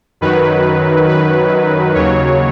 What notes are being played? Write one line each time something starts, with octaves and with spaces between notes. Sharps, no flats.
F#2 D#3 F#3 B4
B4
D#2 C#3 F#3 C#5